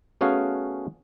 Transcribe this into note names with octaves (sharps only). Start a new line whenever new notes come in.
A3 B3 C#4 F#4 G#4 F5